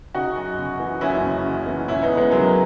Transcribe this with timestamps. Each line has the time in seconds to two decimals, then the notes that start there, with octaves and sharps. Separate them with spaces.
0.14 C#3 D#4 F#4
0.36 F#2
0.58 C#3
0.79 E3
1.01 F#1 C#4 E4
1.23 C#3
1.45 C#3
1.66 E3
1.88 C#2 C#4 E4
2.02 B3 D#4
2.10 C#3
2.17 G#3 B3
2.31 C#3 F#3 A#3